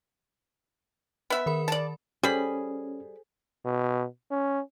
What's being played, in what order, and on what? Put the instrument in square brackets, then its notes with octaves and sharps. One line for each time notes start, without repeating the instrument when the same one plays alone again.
[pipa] B3 E5
[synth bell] D#3 A#4 B5
[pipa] D5 A5
[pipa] G3 B5 [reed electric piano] C#4 [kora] G#4 [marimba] A4 C5
[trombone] B2
C#4